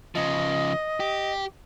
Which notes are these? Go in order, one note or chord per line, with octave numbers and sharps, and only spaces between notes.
C#3 F3 D#5
G4